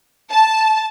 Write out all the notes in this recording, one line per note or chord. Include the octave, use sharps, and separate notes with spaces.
A5